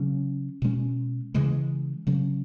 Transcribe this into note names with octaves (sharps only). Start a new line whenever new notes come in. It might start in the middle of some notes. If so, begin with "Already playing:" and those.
Already playing: C#3 F#3 C#4
B2 G#3 C#4
C#3 E3 G#3
C#3 F#3 C#4